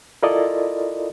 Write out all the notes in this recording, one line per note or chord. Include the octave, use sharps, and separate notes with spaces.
E4 F4 A4 A#4 D5 D#5